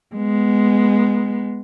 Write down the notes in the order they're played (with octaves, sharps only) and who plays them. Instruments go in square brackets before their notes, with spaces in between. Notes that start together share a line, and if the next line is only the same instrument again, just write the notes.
[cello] G#3 B3